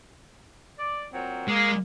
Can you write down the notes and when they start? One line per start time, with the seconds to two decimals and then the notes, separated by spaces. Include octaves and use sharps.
0.79 D5
1.13 A#2 F#3 C4
1.49 G#3 A#3